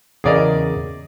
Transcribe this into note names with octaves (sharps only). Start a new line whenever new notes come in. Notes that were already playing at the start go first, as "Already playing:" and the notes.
E2 C#3 G#4 A#4 D5 D#5